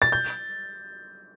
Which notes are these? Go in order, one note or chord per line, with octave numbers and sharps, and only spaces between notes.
A6
G6